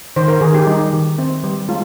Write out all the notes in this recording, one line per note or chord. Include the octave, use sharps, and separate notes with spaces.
D#3 C5
A#4
D#3 G#4
G4
G3 D#4
D#3
C4
G3
G#3 F4